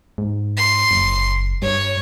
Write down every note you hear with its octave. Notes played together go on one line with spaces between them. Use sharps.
G#2
C6
F#1
G2 C#5